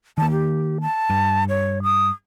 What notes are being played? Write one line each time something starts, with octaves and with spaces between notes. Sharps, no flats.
D#3 A#3 A5
G4
A5
G2
C#5
D#6